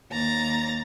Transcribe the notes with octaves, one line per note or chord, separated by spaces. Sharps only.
D#2 A#5 A6